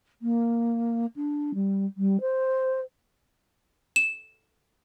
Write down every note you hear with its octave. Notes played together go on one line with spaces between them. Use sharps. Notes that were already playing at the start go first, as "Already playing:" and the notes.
A#3
D4
G3
G3
C5
E7